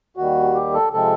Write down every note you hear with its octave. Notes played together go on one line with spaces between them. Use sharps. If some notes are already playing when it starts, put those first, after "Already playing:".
D#2 D#3 G3 F#4
G4
A4
C3 F3 G#3 C4 A4